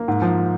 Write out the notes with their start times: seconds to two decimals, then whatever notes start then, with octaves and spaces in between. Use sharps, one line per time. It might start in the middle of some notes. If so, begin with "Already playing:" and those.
Already playing: A#3
0.08 G#2
0.22 F3